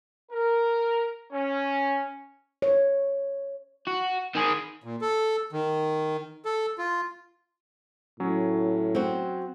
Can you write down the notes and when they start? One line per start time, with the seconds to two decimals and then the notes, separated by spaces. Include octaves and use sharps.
0.32 A#4
1.33 C#4
2.62 C#5
3.87 F#4
4.35 D#3 G#4
4.84 A#2
5.01 A4
5.53 D#3
6.45 A4
6.78 F4
8.20 A2 F#3 C#4
8.95 C4 F#4